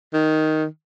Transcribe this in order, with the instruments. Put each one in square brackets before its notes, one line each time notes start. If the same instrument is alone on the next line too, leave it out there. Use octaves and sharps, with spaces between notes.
[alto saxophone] D#3